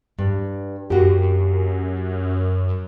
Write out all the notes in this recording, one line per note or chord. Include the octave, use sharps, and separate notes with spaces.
G2
F#2 A#3 F#4 G4